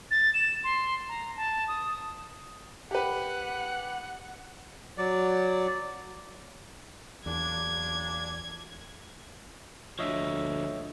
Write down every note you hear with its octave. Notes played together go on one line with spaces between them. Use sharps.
A6
E7
C6
A#5
A5
D#6
G4 B4 F#5
F#3 D5
E2 A#2 F#3 D4 G#6
D2 D3 F3 C#5 D#5 E5